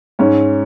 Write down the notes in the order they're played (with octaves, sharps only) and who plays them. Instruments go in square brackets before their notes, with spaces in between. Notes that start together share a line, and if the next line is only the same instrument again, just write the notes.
[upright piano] G#2 C#4